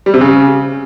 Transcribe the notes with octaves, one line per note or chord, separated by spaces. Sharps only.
G3
C3
C#3